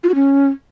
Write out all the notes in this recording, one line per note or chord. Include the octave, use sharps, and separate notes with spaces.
F4
F#4
C#4